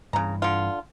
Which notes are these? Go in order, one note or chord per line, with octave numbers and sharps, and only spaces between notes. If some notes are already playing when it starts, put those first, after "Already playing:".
G2 C#3 E3 A#5
D3 F4